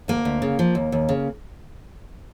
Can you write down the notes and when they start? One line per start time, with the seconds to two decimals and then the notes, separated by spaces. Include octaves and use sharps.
0.08 D2 A#3
0.25 D2
0.42 C#3
0.59 F3
0.75 D#2
0.92 D#2
1.09 C#3